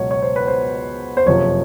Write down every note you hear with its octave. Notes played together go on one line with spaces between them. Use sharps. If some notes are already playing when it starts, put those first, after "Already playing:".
Already playing: C#2 B2 F#3 C#5
C#5
C5
B4
C5
C5
F#1 F2 C3 F3 C#5